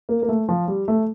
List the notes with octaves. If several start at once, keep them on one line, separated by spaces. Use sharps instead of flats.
A#3
A#3
A3
F3
G3
A3